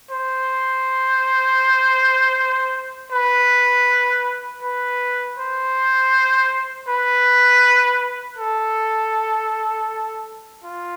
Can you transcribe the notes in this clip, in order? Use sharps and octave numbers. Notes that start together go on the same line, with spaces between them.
C5
B4
B4
C5
B4
A4
F4